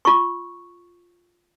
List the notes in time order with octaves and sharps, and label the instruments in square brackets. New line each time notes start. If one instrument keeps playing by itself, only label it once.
[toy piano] F4 C#6